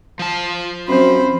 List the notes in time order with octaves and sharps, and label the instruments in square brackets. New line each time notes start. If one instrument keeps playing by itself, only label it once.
[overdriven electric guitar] F3 A5
[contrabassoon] F#2 [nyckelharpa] C4 B5 [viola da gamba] C5